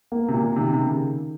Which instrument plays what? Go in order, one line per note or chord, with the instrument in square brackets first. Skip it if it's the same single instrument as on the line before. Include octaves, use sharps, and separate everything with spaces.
[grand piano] A#3
[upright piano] C3
A#2
[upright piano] C3 [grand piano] D#3
[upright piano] C3
C#3